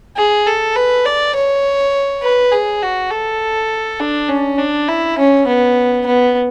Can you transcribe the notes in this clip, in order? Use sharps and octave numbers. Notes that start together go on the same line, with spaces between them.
G#4
A4
B4
D5
C#5
B4
G#4
F#4
A4
D4
C#4
D4
E4
C#4
B3
B3